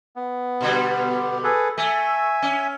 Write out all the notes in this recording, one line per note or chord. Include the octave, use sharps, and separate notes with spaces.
B3
B2 D3 G3
G#4 A4 B4
A3 E5 G#5
C#4